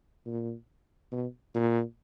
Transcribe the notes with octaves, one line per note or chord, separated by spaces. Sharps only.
A#2
B2
A#2